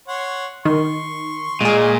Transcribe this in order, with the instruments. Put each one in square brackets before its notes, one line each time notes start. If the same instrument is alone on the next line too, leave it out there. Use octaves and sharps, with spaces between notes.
[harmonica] C#5 F#5 C6
[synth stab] D#3 [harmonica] C6 C#6
[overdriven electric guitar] A#2 [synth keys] G#3 G#4